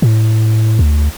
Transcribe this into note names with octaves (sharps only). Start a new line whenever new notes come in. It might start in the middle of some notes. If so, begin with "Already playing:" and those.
A2
D2